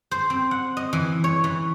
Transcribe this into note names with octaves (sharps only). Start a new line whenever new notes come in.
C5
C4
F#5
D#5
E3
C#5
E3